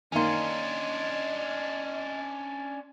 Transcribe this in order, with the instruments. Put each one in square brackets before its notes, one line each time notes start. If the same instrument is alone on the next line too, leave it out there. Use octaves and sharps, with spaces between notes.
[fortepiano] D#3 A#3 [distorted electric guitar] C#4 D4 [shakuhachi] D#5 [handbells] G#5 C6